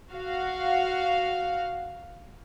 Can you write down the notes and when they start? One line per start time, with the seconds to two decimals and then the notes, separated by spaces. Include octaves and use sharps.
0.12 F#4 F5